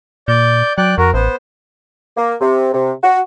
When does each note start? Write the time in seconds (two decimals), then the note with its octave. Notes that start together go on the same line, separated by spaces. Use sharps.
0.28 A#2 D5 G6
0.78 F#3 D5 G5 F#6
0.98 F2 F#4 A#4
1.14 A1 B3 C5
2.17 A#3
2.41 C3
2.74 C3
3.03 F#4